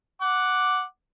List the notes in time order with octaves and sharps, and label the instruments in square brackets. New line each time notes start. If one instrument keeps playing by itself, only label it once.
[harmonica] F#5 D6